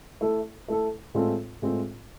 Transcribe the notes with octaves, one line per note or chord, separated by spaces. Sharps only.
A3 E4 A4
A3 E4 A4
A2 G#3 C4 F4 A4
A2 G#3 C4 F4 A4